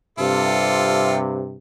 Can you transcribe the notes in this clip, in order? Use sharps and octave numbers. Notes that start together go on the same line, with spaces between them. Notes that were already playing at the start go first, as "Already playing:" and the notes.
G2 C3 F4 A4